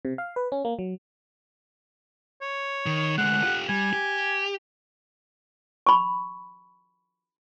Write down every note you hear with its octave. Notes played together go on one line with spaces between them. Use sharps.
C3
F5
B4
C#4
A#3
F#3
C#5
D#3
D2 G#3 F#5
F4 G4
G3 G#5
G4
B5 C#6